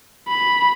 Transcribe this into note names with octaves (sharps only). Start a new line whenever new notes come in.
B5